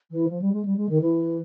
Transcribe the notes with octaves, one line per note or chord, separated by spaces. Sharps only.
E3
F3
G3
G#3
G3
G#3
D#3
E3